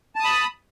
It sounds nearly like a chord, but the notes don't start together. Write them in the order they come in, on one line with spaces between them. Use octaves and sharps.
A5 D#6 B5